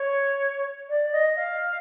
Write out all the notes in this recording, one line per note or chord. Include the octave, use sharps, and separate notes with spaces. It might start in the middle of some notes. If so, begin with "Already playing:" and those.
Already playing: C#5
D5
D#5
F5